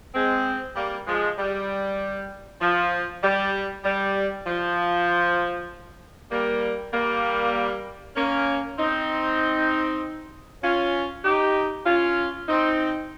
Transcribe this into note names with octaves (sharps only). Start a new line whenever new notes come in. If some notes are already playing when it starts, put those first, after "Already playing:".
G#3 C4
G3 A#3
F3 G#3
G3
F3
G3
G3
F3
G3 A#3
G3 A#3
A#3 C#4
C4 D#4
C#4 F4
D#4 G4
C#4 F4
C4 D#4